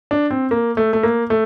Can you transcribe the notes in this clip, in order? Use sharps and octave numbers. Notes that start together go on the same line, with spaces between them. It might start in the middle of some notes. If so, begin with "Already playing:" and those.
D4
C4
A#3
A3
A3
A#3
A3